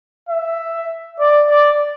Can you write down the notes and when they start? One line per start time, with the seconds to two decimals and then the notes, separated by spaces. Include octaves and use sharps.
0.29 E5
1.20 D5
1.50 D5